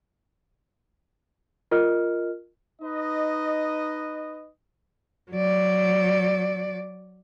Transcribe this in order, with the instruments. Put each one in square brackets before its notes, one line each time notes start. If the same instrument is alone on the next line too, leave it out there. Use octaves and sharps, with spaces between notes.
[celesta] F4 A#4 D#5 F6
[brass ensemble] D#4 B4 D#5
[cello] F#3 D5